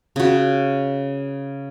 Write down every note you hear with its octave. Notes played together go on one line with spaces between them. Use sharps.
C#3 F#4